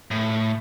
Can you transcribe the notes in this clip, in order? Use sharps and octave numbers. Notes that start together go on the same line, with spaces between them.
A2